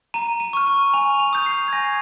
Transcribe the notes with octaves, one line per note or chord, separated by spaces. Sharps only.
A#5 D#7
D#7
C#6 F6
D#7
G#5 F7
F7
D#6 G6
C7
G#6
G#5 A#6